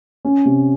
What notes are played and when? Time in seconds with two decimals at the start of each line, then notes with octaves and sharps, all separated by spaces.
0.25 C#4
0.45 C3